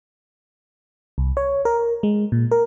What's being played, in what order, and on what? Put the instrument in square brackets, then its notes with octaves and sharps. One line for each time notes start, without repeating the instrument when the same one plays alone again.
[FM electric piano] C2
C#5
A#4
G#3
A#2
A#4